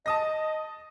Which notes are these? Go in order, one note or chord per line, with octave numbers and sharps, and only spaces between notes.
D#5 A5 D#6 A#6